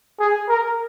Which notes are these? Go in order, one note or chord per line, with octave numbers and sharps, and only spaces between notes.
G#4
A#4